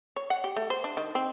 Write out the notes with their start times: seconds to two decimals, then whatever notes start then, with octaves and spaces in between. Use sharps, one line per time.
0.16 C#5
0.30 F#5
0.44 G4
0.56 A3
0.70 C5
0.84 D4
0.97 D#3
1.15 C4